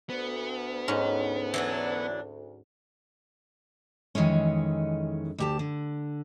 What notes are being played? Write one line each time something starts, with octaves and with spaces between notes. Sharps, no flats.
D2 B3
G#2 C#4 F#4
E3 F#3 D4
F2 D#3 E3 G#3 C#4
D2 G4 A5
D3